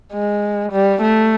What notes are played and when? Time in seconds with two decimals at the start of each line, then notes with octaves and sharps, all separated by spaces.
0.13 G#3
0.72 G3
1.02 A3